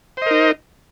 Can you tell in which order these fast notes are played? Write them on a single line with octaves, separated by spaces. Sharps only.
C5 D#5 A#4 D#4